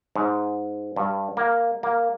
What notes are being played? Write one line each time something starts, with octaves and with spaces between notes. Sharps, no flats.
G#2
G2
A#3
A#3